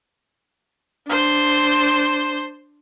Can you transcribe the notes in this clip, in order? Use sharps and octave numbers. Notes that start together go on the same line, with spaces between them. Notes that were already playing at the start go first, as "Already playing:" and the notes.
D4 C5